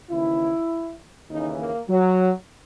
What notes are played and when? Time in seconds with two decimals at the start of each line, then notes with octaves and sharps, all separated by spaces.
0.10 D#2 C#3 E3 E4
1.29 D#2 C#3 E3 D#4
1.59 A#3
1.89 F#3